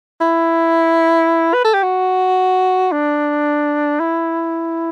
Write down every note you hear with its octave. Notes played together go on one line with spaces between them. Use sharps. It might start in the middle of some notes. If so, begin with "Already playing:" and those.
E4
B4
A4
G4
F#4
D4
E4